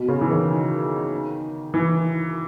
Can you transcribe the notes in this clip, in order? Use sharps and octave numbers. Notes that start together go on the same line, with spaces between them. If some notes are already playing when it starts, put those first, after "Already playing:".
Already playing: B2
C#3
E3
D#3
E3